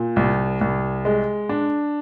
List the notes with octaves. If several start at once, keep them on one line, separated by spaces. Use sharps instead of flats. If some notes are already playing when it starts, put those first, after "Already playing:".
Already playing: A#2
C2
C2
G#3
D4